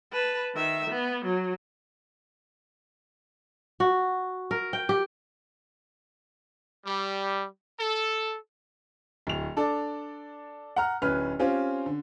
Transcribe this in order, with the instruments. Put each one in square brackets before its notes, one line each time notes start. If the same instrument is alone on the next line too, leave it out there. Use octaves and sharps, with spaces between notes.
[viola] B4 A5
D#3 E5
B3
F#3
[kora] F#4
A#4
G5
G4
[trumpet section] G3
A4
[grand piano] D1 F7
D4 A4 D5
F#5 A#5 F6
D1 C#4 B4 F6
C4 C#4 F4 G4
D3